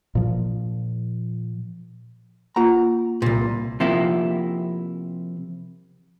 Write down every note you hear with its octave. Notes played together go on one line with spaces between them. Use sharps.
A#2 F3
A#3 F4 A#5
C2 A#2
C3 F3 A#3 E4